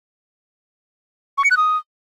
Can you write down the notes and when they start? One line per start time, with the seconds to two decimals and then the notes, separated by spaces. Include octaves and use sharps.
1.38 C#6
1.44 C#7
1.51 F#6
1.57 D#6